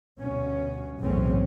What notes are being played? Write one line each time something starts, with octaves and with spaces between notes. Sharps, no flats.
D2 G2 B2 C#4
F#1 B1 E2 A2 C4 C#4